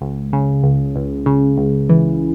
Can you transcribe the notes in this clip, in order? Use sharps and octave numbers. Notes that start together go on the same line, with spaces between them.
C#2
C#3
C#2
C#2
C#3
C#2
E3